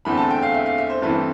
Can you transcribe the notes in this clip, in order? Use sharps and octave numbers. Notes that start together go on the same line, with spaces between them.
E2 D3 A3 C4 B5
A5
G5
F5
E5
F5
E5
C5
G2 E3 A3 C4 B4